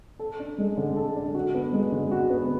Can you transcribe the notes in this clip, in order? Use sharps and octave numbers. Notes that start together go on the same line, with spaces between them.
A4
D4
G#3
D3
A4
D4
F#4
B3
G#3
D3
F#4
B3